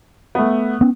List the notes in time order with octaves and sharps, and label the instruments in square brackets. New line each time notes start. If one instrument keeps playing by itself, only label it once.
[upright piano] A3 B3
[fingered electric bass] B3 C#4